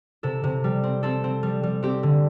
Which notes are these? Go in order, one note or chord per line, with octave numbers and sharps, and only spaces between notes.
C3 A4
C3
G3
C4
C4 A4
C4
G3
G3
C4 G4
D3